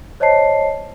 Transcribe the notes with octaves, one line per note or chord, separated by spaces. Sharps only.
C5 C#5 D#5 A5 C7